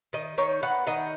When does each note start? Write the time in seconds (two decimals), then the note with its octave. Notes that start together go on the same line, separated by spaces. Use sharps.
0.13 D#3 D#5
0.38 D#3 C#5
0.63 B3 F#5
0.87 D#3 D#5